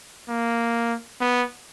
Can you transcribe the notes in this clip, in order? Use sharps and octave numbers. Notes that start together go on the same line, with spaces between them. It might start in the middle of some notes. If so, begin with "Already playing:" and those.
A#3
B3